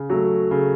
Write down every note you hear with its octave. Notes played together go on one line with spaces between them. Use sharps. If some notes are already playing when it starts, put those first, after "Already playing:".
Already playing: C#3
F#3 A3
C#3